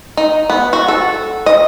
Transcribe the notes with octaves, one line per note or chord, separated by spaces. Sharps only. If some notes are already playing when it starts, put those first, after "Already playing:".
D#4
B3
F#4
A4
D#5